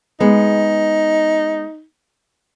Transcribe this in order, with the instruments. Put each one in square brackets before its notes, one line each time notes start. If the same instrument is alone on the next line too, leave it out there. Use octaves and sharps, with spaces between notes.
[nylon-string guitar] G#3 B3 [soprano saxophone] D#4